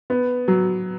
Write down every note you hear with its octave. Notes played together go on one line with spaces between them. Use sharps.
B3
F#3